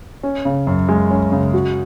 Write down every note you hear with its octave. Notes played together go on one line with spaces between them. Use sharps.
C#4
C#3
F#2
G#3
C#4
C#3
F#4